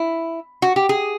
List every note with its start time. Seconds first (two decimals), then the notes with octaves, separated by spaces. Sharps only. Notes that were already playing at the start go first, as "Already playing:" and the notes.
Already playing: E4
0.62 F#4
0.76 G4
0.89 G#4